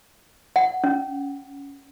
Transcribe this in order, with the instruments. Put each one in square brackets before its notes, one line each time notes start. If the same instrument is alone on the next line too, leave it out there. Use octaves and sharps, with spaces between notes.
[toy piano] F#5
C#4